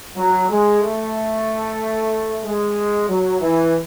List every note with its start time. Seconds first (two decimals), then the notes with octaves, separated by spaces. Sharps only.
0.17 F#3
0.49 G#3
0.82 A3
2.44 G#3
3.08 F#3
3.41 E3